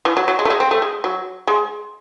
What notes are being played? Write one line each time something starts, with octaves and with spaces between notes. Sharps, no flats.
E3
F#3
F#3
G#3
A3
G#3
C4
A3
G#3
F#3
G#3